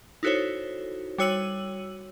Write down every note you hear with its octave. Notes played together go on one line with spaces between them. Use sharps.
D#4 E4 F#4 A4 C5 C#5
G3 F#4 C#5 E6 D#7 F#7